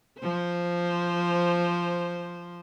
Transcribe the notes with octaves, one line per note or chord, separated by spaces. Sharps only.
F3 C5